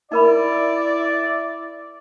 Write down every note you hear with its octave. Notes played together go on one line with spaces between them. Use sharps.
D#4 E4 A#4 D5 B5